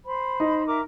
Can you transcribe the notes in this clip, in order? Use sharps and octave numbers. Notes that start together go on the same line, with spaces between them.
C5 B5
D#4
A#4 E5 D6